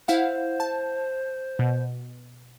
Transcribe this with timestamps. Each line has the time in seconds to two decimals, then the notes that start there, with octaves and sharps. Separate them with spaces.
0.08 E4 C5 F5 F#5
0.60 A5
1.59 B2